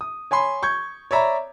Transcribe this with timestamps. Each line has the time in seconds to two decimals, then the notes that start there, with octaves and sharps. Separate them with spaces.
0.01 D#6
0.31 C#5 G#5 B5 C6
0.63 C#6 G6 G#6
1.11 C#5 D5 E5 A#5 B5